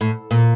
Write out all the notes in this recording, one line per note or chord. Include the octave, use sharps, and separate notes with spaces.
A2
A#2